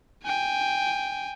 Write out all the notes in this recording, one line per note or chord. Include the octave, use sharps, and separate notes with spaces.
G5 G#5